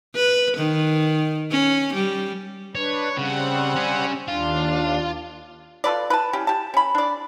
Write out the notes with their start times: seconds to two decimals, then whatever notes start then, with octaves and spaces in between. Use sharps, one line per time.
0.15 B4
0.57 D#3
1.51 C#4
1.94 G3
2.75 D4 B4 C#5
3.17 C#3 G3 C4 F#5
3.76 C#4 G#4
4.28 D#2 D4 F4
5.84 F4 A4 B4 D5
6.10 B4 A5
6.33 E3 C#4 G4
6.47 G4 A5
6.74 C#4 B5
6.95 D4 D5